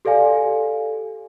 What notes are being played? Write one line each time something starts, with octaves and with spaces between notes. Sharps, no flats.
G4 A4 D5 F5 G#5